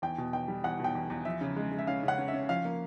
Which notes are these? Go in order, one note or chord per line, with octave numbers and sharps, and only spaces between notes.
E2 G5
B2
E2 G5
G3
E2 F#5
B2 G5
E2
E2
F3 E5
C#3
G#3
G#3
E5
C#4 F5
C#3 F#5
C#4
E5
C#4
F3 F5
A#3